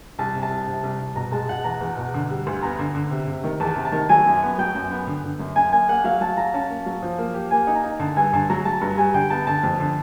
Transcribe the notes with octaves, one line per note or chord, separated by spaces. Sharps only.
C2 A5
C3
A5
C2
C3
C2
C2
B2 A#5
G#3 A5
B2 F#5
E2 A#5
E2
B2
D3
G3
D2
B3 A#5
D3
D3
C3
C3
D#3
E2 A5
C3
A5
D#3
F#3 G#5
F#2
B3
F#3 G5
F#2
B3
D3
D3
F#2
F#2 G#5
A#3 G#5
A#3 F#5
F#3 F5
F#3 A5
F#3 A#5
C#4 A5
A#3
F#3
F3
A#3
G4
A#3 G#5
D#4
A#5
D#4
D3 A5
G2 G#5
D3 A5
F#3 A#5
F#3 A5
G2 A#5
G3 G#5
D3 G5
B3 A5
D3 A5
F2
D3